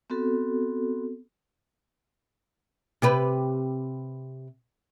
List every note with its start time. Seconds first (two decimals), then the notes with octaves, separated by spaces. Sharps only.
0.10 B3 C4 F#4 A4
3.02 C3 G4 B4